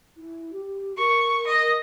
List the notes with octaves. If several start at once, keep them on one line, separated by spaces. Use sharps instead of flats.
E4
G4
A#4 C#6
D#5